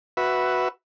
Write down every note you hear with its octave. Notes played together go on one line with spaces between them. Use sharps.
F#4 B4 E5